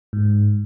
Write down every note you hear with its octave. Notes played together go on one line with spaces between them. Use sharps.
G#2